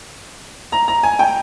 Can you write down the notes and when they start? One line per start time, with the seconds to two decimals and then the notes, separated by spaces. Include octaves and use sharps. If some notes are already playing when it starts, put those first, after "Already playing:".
0.72 A#5
0.88 A#5
1.03 G#5
1.19 G5